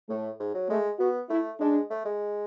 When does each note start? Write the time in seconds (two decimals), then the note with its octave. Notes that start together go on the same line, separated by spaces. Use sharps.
0.09 A2 A3
0.40 G#2
0.54 F#3
0.69 G#3 A3
1.00 B3 F#4
1.30 A3 E4
1.60 G#3 D4
1.90 A3
2.05 G#3